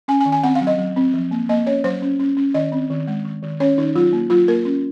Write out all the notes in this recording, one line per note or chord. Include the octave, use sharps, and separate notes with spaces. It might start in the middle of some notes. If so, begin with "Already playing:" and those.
C#4 G#5
G#5
D#3
G#5
C4 F#5
F5
F#3
D#5
F#3
C4
F3
A#3
A#3 D#5
C#4 C#5
F#3 C5
C#4
C#4
C#4
D#3 D#5
C4
D#3
G#3
D#3
D#3
C#4 C#5
D#3 D#4
F#3 F4
A#3
F#3 F4
A#3 A#4
C#4